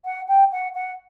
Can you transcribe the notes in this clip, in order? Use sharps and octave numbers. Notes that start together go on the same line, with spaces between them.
F#5
G5
F#5
F#5